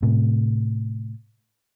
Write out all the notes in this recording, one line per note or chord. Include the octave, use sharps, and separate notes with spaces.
A2 C3